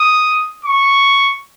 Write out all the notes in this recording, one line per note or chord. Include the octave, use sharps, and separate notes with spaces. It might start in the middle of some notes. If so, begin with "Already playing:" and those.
Already playing: D#6
C#6